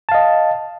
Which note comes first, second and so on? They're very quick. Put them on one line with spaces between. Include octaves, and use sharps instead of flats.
A5 F5 D#5